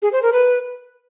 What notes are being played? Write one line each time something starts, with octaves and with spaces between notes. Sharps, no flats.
G#4
C5
A#4
B4